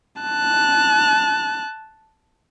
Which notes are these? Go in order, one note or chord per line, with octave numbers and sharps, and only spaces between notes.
A5 F#6